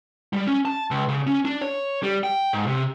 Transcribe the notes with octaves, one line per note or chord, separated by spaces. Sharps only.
G3
C#4
A5
C#2
C#3
C#4
D4
C#5
G3
G5
G#2
C3